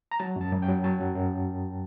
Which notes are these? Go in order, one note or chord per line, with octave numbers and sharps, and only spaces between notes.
A#5
F#3 A5
F#2 A5
F#2
G5
F#3
F#3 A5
F#2
F#2